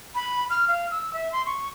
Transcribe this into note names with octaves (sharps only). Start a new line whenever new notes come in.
B5
F6
F5
E6
E5
C6
C#6